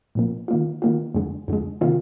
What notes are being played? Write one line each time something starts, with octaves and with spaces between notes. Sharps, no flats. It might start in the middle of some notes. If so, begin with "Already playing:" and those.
A#2 F3 A#3
D#3 A#3 F4
D#3 A#3 F4
F2 D3 G#3
F2 D3 G#3
C3 D#3 A#3 F4